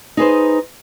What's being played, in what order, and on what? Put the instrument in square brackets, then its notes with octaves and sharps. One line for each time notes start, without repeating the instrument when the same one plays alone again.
[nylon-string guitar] D#4 G#4 B4 C5